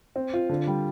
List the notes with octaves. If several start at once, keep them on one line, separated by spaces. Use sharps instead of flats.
C4
F4
D3
G3